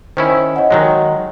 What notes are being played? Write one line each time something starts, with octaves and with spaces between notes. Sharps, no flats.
D#3 C#4 E4 C5
C#5 D#5 F#5
D#3 F#3 G#3